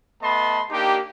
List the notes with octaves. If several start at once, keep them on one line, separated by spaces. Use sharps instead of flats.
A3 B3 D#5 A5 B5 C6
A#3 D4 D#4 G4